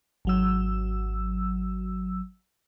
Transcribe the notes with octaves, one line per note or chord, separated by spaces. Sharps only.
G#1 F#3 E6